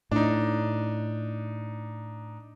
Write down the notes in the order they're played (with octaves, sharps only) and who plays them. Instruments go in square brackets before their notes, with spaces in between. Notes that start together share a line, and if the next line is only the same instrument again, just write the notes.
[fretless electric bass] A2 [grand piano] D4 D#4